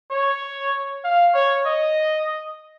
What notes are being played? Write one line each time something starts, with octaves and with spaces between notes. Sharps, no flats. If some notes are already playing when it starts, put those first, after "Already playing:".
C#5
F5
C#5
D#5